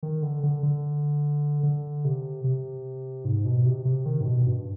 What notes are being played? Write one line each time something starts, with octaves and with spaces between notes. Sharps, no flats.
D#3
D3
D3
D3
D3
C3
C3
G#2
B2
C3
C3
D#3
G#2
B2
G2